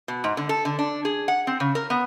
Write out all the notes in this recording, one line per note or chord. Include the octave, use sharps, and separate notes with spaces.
B2
G#2
D3
A4
D3
D4
G#4
F#5
C4
C#3
A#4
B3